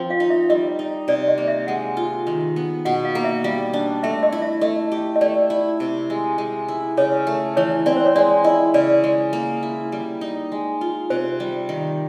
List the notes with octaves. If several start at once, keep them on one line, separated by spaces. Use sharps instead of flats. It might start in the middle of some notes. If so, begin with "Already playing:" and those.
Already playing: F3 C4
F5
D#4
E5
G3 D#5
D#4
C3 D5
D#5
A#3
E5
G#3 F#5
F4
D#3
B3
B2 F#5
F5
A#3
E5
G3 F5
D4
A3 E5
D#5
E4
E5
A3 D#5
G4
D#5
A3 D5
E4
C3
G#3
G#3
E4
C#3 C#5
A3
E3 C#5
C4 D5
C5
C#5
G#3 D5
E4 D#5
C#3 D5
G#3
A#3
E4
G3
D#4
G#3
F4
C3 C5
G3
D#3